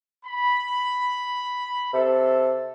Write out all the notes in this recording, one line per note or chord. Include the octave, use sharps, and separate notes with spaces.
B5
C3 A4